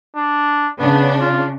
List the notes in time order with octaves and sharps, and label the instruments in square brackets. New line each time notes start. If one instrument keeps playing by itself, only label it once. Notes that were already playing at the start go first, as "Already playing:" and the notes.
[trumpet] D4
[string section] C#3 D4 [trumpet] B3
[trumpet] F4